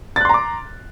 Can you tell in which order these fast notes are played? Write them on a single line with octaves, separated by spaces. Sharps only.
A6 F#6 C6 A#5 D6